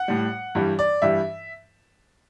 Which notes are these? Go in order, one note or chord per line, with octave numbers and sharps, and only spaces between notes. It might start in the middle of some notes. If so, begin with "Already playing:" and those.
Already playing: F#5
A2 G3
G2 E3 G3
D5
G2 E3 G3 E5